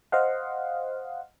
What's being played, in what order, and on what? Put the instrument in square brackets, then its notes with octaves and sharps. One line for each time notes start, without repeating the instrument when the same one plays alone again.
[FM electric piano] C5 D#5 F5 F#5